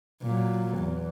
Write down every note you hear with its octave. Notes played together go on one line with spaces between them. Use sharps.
A#2 F#3
E2